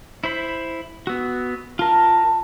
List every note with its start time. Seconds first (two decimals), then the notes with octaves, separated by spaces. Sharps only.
0.24 E4 C5 B5
1.07 B3 F#4 E6
1.79 F4 A#4 A5